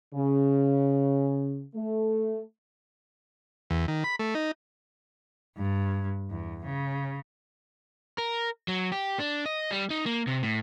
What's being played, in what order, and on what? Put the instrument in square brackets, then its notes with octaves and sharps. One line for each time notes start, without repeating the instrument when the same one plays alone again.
[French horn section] C#3
A3
[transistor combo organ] E2
D#3
B5
A3
D#4
[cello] G2
E2
C#3
[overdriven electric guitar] A#4
F#3
G4
D4
D#5
G3
D#4
A#3
C3
A2